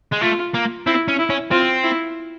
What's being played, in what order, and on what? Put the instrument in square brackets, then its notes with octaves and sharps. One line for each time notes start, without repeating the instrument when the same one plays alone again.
[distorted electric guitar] G#3
[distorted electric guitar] A3 [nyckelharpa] F4
[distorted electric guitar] A#3
[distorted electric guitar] C4 [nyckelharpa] E4
[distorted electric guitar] C#4
[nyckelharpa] E4
[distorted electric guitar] C#4
[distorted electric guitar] C4 [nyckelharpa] F4
[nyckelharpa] E4